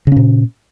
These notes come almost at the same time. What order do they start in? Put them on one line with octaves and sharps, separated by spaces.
C#3 C#4 A#2